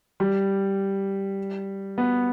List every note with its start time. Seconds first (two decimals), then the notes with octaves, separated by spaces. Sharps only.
0.20 G3
1.98 B3